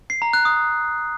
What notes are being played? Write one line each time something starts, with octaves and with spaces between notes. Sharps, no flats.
C7
A#5
F#6
D#6